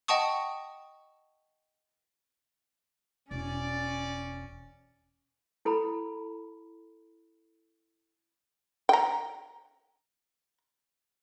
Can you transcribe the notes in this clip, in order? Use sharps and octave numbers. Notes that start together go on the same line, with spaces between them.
D#5 F#5 G5 A5 C#6 D#6
E1 C#4 D5
E4 A4 A#5 B5
G5 A#5